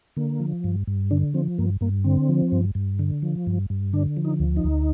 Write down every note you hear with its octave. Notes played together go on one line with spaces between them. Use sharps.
D3 A#3
F3
G2
G2
D3 D4
F3 C4
G2 A#3
G2 A#3
D3 C4
F3
G2
G2
D3
F3
G2
G2
D3 D4
F3
D#4
D2
D#4
D2